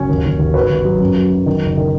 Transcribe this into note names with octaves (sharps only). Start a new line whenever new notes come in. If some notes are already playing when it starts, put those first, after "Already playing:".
Already playing: F#1 C#4 F#4
D#2
D#2
D#2
G#1 F#4 B4
G#1
F#3
F#2
F#3
F#3
D#3
F#1
D#3